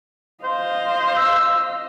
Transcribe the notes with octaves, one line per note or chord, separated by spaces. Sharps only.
C5 D#5 F5
E6